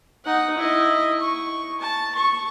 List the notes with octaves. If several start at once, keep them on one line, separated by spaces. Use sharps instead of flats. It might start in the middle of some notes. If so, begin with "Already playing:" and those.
D#4 F#5
E4 D#5
C#6
A5
C#6